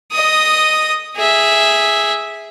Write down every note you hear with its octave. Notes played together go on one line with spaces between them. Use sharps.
D#5 D#6
G#4 E5